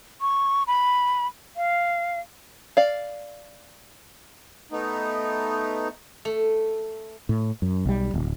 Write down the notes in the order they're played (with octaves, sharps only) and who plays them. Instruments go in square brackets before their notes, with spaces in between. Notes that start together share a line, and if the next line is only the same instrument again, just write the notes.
[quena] C#6
B5
F5
[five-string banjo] D5 F5
[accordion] A3 B3 D#4
[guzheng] A3
[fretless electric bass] A2
F#2
B1 G3
D1